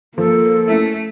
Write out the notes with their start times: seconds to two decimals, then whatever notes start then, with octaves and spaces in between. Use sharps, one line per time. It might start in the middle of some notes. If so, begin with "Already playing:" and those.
0.18 F3 A#3 A4
0.68 A3 C#4 E4